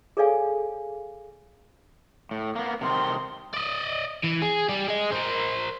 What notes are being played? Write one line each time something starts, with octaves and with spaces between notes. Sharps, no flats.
G#4 A4 C#5 D5 F5 G#5
A2
A#3 B3
C3 D#3 C4 C6
D5 D#5
E3
G#4
G3 G4
G#4 D#5
A#4 C5